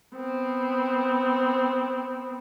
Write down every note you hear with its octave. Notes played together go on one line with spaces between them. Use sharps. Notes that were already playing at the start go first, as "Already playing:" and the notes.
B3 C4